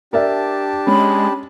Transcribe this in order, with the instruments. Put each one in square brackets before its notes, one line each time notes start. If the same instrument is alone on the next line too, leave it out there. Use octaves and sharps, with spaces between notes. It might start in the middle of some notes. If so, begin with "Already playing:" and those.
[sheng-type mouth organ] D4 G4 A5 [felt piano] A#4 D5 E5
[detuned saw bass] G#3 [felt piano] C#4 [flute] B5